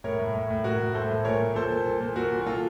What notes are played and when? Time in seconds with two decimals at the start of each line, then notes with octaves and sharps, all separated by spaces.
0.04 A2 A#4 C#5
0.19 A2
0.34 A2
0.50 A2
0.64 A2 F#4 A#4
0.81 A2
0.94 A2 A4 C5
1.11 A2
1.25 A#2 A#4 C#5
1.40 A#2
1.55 A#2 A4 C5
1.70 A#2
1.86 A#2
2.00 A#2
2.16 A#2 F#4 A#4
2.32 A#2
2.41 F#4
2.46 A#2 F4 A4